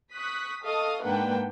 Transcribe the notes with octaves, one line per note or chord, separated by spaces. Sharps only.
C#6 D#6 F#6 B6
A4 D#5 F5 C#6 D#6
G#2 A#3 D4 B4 F#5 G5